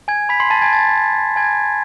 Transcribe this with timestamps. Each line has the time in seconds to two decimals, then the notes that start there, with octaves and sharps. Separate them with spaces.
0.08 G#5 G#6
0.29 B5 B6
0.40 C6 C7
0.50 A5 A6
0.62 G#5 G#6
0.73 A5 A6
1.36 G#5 G#6